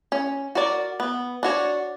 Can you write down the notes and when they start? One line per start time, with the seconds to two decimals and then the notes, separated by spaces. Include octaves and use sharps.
0.12 C#4
0.55 F#4 A#4 D5
1.00 B3
1.43 D4 F#4 C#5